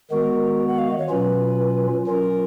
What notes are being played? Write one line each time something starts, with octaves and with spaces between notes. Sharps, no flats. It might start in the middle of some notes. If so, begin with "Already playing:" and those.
D#3 G#3 B3 F#4 A#4
F#5
F5
D#5
C#5
B2 F#3 C#4 F4 B4
F#3 C#4 F4 A#4